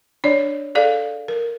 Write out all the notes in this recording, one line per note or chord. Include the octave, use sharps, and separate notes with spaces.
D4 C#5 D5
G#4 A4 D5 F5
A#4